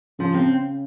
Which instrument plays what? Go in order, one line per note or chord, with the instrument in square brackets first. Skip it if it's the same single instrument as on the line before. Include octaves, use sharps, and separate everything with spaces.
[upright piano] C#3 [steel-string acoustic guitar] F3
[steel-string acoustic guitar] C4